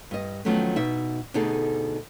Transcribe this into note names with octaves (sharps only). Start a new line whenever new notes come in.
G2 D#5
D#3 F3 F#3 A3 B3 C#4
B2 D#4 E5
D2 B2 D#4 G#4 A4